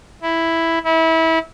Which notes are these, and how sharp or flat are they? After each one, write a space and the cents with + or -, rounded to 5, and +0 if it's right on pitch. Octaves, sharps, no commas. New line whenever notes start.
E4 +0
E4 -25